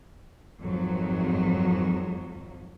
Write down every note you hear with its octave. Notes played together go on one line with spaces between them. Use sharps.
G#1 F2 F#3